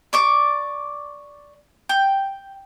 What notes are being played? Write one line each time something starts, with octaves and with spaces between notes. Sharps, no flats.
D5 C#6 D6
G5